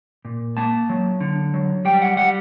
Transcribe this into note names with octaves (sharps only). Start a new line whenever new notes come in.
A#2
A#3 A5
F#3
D3
F#3
G3 G5
F#5
G3 F#5